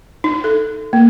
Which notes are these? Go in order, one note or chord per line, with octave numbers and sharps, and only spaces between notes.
D#4
A4
A#3